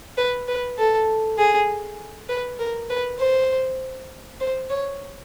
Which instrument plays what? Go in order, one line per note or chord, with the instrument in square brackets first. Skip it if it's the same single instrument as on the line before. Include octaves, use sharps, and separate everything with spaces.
[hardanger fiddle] B4
B4
A4
G#4
B4
A#4
B4
C5
C5
C#5